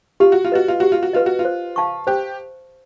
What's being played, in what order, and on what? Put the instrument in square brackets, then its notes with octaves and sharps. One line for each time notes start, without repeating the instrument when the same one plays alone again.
[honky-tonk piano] F4 [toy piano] G4
[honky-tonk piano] F#4
F4
[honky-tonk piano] F#4 [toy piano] B4 D#5
[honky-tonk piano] F4
[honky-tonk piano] F#4 [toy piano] G4
[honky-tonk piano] F4
F#4
[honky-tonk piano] F4 [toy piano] B4 D#5
[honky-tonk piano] F#4
F4
[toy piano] C5
F5 A5 C#6
[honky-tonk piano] G4 [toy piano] C5